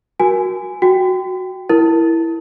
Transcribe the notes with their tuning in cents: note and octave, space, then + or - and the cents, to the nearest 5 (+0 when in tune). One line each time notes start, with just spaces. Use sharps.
F#4 +0 A#4 +25 G#5 +0
F#4 +0 G5 +0
E4 +5 A#4 +0